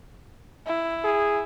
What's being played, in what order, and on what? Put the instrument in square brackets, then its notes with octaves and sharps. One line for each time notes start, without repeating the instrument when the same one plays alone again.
[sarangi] E4
[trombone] G#4